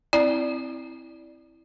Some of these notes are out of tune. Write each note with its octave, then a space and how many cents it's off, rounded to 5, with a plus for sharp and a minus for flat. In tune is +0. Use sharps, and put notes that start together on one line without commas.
C4 +0 E4 -10 D5 -5